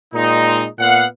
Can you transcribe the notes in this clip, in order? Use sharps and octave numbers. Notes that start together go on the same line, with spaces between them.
A#2 G#3 C4 D#4
A#2 B3 F5 F#5